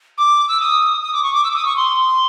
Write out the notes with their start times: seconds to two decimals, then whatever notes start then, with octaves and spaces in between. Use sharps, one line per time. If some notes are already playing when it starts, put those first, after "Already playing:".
0.18 D6
0.48 E6
0.61 D#6
1.02 D#6
1.13 D6
1.23 C#6
1.33 D6
1.44 E6
1.51 D6
1.56 D#6
1.65 C#6
1.77 C6